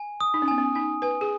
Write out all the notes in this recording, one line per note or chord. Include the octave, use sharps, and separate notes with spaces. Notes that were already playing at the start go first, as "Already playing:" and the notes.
Already playing: G#5
D#6
D#4
C#4
B3 G#5
C#4
D#4 G#5
B4 G#5
G#4